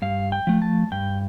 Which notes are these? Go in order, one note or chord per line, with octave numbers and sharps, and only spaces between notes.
G2 F5
G5
F3 A3
A5
G2 G5